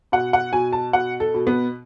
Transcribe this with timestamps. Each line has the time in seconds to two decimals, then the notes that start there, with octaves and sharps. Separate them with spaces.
0.12 B2 F#5
0.33 F#5
0.53 B2 G#5
0.73 A5
0.93 B2 F#5
1.20 A4
1.34 B2
1.47 B3